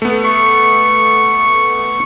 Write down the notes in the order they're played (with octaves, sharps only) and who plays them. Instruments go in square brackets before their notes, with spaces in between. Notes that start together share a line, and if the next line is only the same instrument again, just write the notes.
[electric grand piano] A3 B3
[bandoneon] C#6